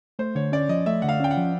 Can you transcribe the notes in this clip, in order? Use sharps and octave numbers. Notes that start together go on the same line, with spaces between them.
A3 C5
D3 C#5
C#4 D5
F3 D#5
A3 E5
D3 F#5
F5
C#4 G5
F#5
F3